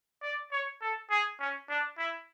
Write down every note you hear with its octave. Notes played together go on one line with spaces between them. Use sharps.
D5
C#5
A4
G#4
C#4
D4
E4